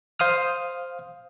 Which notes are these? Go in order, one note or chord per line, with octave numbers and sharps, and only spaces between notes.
C5 F5 D#6 F6